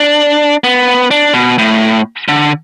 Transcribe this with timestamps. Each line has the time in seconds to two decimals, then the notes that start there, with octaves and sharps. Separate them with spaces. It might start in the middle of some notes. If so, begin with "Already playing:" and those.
Already playing: D4
0.64 B3
1.11 D4
1.34 B2
1.58 A2
2.28 D3